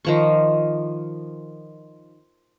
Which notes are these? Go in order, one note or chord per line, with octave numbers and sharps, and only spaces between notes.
D#3 F3 C#6